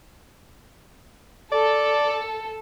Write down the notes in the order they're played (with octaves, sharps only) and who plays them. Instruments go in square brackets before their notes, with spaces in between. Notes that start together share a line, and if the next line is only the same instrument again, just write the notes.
[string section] A4 [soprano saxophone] D5